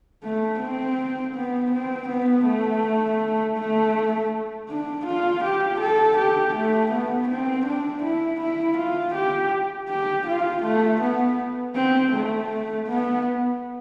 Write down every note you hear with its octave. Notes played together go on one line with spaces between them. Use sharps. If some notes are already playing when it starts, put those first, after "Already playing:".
A3
C4
B3
C4
B3
A3
A3
D4
F4
G4
A4
G4
A3
B3
C4
D4
E4
E4
F4
G4
G4
F4
A3
B3
C4
A3
B3